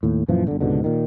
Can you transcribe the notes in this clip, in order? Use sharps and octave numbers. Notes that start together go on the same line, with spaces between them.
D#2 A2
F#2 A#2 E3 F3
G1 D3
C#2 G#2 B2 D3
A#2 D#3